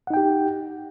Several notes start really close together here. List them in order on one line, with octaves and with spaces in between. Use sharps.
F#5 D#4 G5 G4